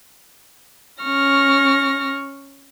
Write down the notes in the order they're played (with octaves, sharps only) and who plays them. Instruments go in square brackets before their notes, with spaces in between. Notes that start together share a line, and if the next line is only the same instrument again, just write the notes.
[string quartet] C#4 C#6 F6 A#6